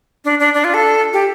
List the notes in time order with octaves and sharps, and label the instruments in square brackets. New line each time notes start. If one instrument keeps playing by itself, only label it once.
[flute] D4
D4
D4
F4
A4
G4